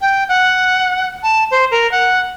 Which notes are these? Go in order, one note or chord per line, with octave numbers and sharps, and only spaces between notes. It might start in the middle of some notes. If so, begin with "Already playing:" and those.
G5
F#5
A5
C5
A#4
F#5